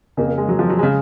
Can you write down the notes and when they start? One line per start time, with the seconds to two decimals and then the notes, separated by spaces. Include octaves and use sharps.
0.17 F2 C#3 A#3
0.29 A#3
0.38 G#3
0.49 F#3
0.59 F3
0.69 F#3
0.79 G#3
0.83 C#3